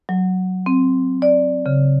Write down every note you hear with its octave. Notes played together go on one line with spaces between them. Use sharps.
F#3
C4
D5
C#3